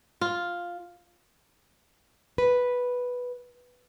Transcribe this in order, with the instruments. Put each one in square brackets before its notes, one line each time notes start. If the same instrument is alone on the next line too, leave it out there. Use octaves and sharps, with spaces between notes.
[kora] F4
[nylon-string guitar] B4